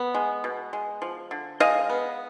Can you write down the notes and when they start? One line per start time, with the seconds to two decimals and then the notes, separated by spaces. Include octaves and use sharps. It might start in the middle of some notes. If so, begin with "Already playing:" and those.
Already playing: B3
0.15 G#3
0.44 B2
0.73 G#3
1.02 F3
1.31 D3
1.60 G#3 D#5 F5
1.90 B3